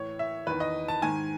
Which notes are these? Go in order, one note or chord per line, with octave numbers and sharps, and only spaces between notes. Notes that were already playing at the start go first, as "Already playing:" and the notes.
Already playing: A2 E3 C#5
E5
E2 D#3 B4
D#5
A5
G#2 D#3 G#5